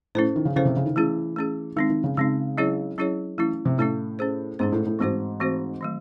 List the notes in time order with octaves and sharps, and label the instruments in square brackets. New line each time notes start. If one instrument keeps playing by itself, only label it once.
[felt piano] A2 [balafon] C#4 E4 A4 C5
[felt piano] D#3
C#3
[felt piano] C#3 [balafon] C#4 E4 A4 C5
[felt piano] C3
C#3
D#3
[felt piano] E3 [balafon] A3 C#4 G#4
[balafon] A3 C#4 G#4
[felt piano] D#3 [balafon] G#3 C4 D#4
[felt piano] D#3
C#3
[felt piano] C#3 [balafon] G#3 C4 D#4
[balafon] F#3 C#4 E4 G#4 C#5
F#3 C#4 E4 G#4 C#5
[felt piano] E3 [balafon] A3 C#4 E4
[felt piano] C3
[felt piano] A2 [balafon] A3 C#4 E4
[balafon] C#4 G#4 C5
[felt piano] G#2 [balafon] C#4 G#4 C5
[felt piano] A2
A2
[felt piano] G#2 [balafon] E3 A3 C4 F#4 C5
[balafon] E3 A3 C4 F#4 C5
D#3 F#3 A3